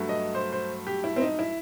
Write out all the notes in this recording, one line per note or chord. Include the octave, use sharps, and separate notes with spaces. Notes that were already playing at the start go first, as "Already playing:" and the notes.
Already playing: G2 F#3 A3
D#5
C5
C5
G4
E4
C4
D#4
E4